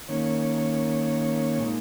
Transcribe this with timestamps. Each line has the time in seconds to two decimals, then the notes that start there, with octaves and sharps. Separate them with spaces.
0.09 D#3 A#3 C#4 C#5
1.58 A#2 G#3 D#4